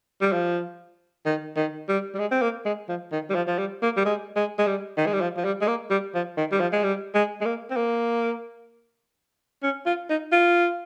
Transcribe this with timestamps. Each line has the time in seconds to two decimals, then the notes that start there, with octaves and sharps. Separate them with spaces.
0.21 G3
0.32 F3
1.25 D#3
1.56 D#3
1.88 G3
2.14 G3
2.19 G#3
2.31 C4
2.42 A#3
2.65 G#3
2.88 F3
3.12 D#3
3.30 G3
3.34 F3
3.47 F3
3.58 G3
3.82 A#3
3.97 G3
4.05 G#3
4.36 G#3
4.58 G#3
4.67 G3
4.97 D#3
5.06 G#3
5.13 G3
5.21 F3
5.36 F3
5.44 G3
5.61 G#3
5.68 A#3
5.90 G3
6.14 F3
6.37 D#3
6.51 G3
6.60 F3
6.72 G#3
6.84 G3
7.14 G#3
7.41 G#3
7.45 A#3
7.70 C4
7.76 A#3
9.63 C#4
9.86 F4
10.09 D#4
10.32 F4